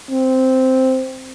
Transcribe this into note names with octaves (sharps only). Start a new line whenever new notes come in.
C4